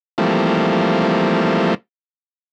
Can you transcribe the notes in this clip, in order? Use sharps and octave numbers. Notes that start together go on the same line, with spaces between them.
E3 F3 G3 A3 A#3 C4